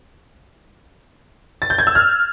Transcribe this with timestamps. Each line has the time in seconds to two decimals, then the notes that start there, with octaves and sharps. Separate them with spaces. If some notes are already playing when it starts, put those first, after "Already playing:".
1.62 A6
1.70 G6
1.78 G#6
1.87 E6
1.95 F6